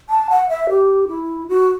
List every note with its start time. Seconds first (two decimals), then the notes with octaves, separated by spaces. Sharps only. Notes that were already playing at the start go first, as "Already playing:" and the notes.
0.09 A5
0.30 F#5
0.49 E5
0.69 G4
1.08 E4
1.49 F#4